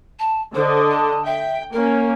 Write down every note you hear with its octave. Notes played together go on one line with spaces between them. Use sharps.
A5
D3 C5 D#5
A5
E5 G5
A#3 C#4 A#4